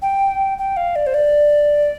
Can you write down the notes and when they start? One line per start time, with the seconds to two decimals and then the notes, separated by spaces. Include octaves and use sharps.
0.02 G5
0.58 G5
0.77 F5
0.96 D5
1.07 C5
1.14 D5